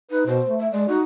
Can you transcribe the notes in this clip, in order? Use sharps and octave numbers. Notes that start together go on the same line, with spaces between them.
D#4 B4
B2 C5
A3
E5
G#3 D5
D#4 F#4